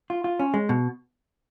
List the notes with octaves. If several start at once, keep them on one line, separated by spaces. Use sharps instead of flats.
F4
F4
C#4
G#3
B2